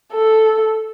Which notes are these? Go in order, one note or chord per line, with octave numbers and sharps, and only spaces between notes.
A4